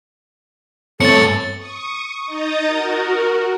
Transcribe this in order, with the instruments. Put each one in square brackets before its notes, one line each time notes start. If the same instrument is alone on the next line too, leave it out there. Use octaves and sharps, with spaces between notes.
[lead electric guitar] G2 C#5 [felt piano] A3 C4 [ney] A4 [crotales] A6 C#7
[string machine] C#6 D#6
D#4 D#5 A#5 D#6 G6 A6
F#4 A#4